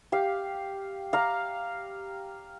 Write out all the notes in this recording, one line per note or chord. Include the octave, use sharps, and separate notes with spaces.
G4 F5
F5 A#5 D6